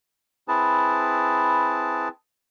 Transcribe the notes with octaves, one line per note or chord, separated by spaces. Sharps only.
C4 E4 G#4 B4 A5